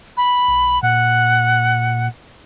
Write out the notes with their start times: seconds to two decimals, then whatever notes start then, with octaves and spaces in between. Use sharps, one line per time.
0.17 B5
0.48 B1
0.83 A#2 F#5